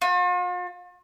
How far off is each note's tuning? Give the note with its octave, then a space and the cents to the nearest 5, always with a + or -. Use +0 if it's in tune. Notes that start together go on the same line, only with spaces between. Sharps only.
F4 +45